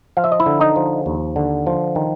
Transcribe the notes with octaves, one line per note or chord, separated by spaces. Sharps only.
F3 F5
E5
D#5
E4 E5
D3
D#4 D#5
F3
D#2
D3
F3
D#3